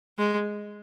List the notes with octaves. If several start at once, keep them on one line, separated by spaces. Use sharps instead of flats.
G#3